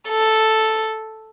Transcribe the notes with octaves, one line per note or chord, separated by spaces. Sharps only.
A4